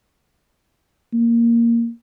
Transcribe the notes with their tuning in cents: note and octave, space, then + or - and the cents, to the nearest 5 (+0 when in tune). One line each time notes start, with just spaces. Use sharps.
A#3 +0